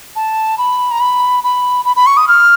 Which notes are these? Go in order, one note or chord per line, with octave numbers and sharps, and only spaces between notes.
A5
B5
A#5
B5
B5
B5
B5
C#6
D#6
F6